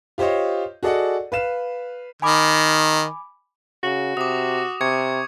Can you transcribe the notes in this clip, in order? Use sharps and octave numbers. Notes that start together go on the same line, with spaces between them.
F4 G4 C5 C#5 D#5
F#4 G#4 A4 D5 D#5 F#5
B4 F5 E7
D#3 G#5 B5 D6
C#3 F#4
C3 D6 D#6
C3 C#6 G#6 C#7